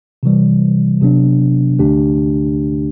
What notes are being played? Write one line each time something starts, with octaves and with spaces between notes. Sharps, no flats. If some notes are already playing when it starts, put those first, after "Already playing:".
C3 E3 G3
C3 F#3 B3 D4
D2 D3 A3 D4 G4